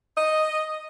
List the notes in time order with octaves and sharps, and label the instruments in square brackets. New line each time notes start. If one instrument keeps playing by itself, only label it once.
[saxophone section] D#5